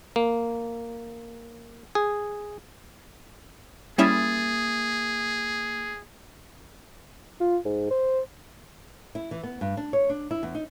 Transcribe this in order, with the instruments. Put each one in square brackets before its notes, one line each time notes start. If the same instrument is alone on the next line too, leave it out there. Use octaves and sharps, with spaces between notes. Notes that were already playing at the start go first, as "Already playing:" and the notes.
[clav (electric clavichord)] A#3
G#4
[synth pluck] G3 C#4 E4 [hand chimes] A#3 D#6 A6 [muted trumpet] G#4
[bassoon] F4
G#2
C5
[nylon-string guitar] E4
E3
B3
G2
D4
C#5
D4
E4
E2
D#4